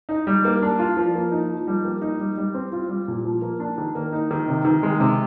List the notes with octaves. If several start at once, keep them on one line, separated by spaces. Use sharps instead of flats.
D#4
G3
A#3
D4
F4
F3
A#3
D#4
F3
G3
A#3
D#4
G3
G3
C4
F4
G3
A#2
F3
A#3
D4
D#3
A#3
D#4
D#3
C3
D#3
G#3
C3